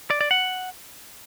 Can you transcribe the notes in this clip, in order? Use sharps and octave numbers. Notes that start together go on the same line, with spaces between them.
D5
D5
F#5